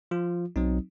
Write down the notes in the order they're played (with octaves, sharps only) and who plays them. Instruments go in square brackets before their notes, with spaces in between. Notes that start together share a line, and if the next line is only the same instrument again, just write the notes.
[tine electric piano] F3 F4
[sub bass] B1 [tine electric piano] F#3 C4 D#4